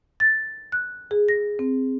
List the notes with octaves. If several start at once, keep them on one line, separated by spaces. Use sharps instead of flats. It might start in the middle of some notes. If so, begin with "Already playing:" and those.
A6
F#6
G#4
A#6
C4